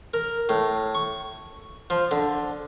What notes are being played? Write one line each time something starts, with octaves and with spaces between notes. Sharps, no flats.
A#4
A2
C#6
F3
D3